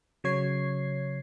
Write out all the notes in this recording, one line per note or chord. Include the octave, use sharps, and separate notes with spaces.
C#3 F#3 C#5 G#6 C7